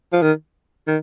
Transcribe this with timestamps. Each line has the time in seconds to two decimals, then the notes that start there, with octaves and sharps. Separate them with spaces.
0.13 F3
0.22 D#3
0.88 D#3